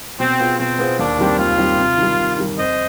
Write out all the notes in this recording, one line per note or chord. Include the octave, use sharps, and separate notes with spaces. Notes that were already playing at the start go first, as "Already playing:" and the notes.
B2 C4
B3 F4 G#4 C5
B2 C4
B3 F4 G#4 C5
D#2 D4
D#3 G3 C4 G4
D#2 F4
D#3 G3 C4 G4
C3
D#3 G3
C3
D#3 G3
F2 C5 D#5